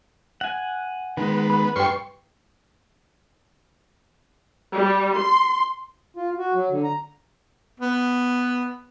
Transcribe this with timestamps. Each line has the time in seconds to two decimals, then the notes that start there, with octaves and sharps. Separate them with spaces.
0.41 F#5 G#5
1.17 D#3 G#3 B3
1.50 B5
1.76 G2 B4 G5 C6 C#6
4.73 G3
5.16 C6
6.17 F4
6.38 F#4
6.54 F#3
6.70 D3
6.84 A#5
7.80 B3